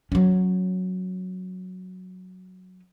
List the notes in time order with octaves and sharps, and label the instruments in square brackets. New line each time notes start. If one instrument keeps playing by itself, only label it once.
[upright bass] F#3 C#4